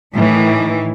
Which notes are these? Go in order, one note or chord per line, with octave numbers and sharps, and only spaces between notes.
A2 D#3 E3